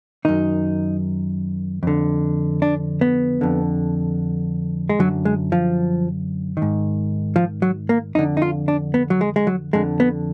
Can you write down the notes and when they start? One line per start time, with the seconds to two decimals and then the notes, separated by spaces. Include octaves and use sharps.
0.25 F#2 D#3 D#4
1.83 F2 D3
2.62 D4
3.01 B3
3.41 F2 D3
4.89 G#3
4.99 F#2 D3 F#3
5.25 G#3
5.52 F3
6.57 D#3
6.62 G#2
7.36 F3
7.62 F#3
7.89 A#3
8.15 F2 D3 D#4
8.37 D#4
8.42 F4
8.68 D4
8.94 B3
9.10 F#3
9.21 G#3
9.36 G#3
9.47 F#3
9.73 F2 D3 G#3
10.00 B3